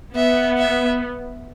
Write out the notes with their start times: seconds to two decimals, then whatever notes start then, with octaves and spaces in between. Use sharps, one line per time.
0.15 B3 E5
0.58 E5